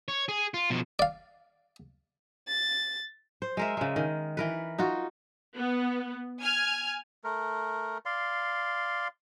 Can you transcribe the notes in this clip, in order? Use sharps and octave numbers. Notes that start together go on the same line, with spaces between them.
C#5
G#4
F4
B2 F3
D5 F5
A6
C5
G#3 A#4 E5
C#3 G#3
D#3
E3 A#4 B4
D#4 F4 F#4
B3
G#5 F6
A3 A#4
D5 F5 C6